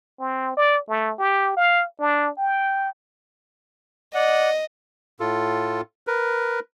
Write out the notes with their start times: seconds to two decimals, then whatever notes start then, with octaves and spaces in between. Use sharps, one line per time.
0.20 C4
0.57 D5
0.89 A3
1.19 G4
1.57 F5
2.00 D4
2.38 G5
4.15 D5 D#5 F#5
5.20 A2 F4 A4
6.07 A#4 B4